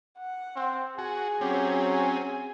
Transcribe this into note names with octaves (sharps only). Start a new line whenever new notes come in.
F#5
C4
F#4 G#4 G#5
F#3 C4 C#4 G4
G#5